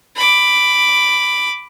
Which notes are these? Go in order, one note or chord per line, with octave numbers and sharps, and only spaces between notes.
B5 D6